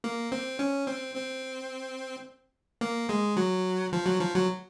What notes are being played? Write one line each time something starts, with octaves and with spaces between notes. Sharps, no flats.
A#3
C4
C#4
C4
C4
A#3
G#3
F#3
F3
F#3
F3
F#3